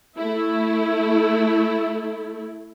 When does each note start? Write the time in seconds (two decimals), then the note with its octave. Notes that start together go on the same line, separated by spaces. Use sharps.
0.18 A3 E4